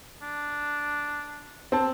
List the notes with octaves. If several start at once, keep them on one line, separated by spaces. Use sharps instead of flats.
D4
C4 A5